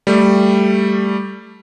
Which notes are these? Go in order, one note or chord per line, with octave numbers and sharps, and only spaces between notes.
G3 A3